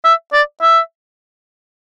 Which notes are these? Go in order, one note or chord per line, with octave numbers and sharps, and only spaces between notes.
E5
D5
E5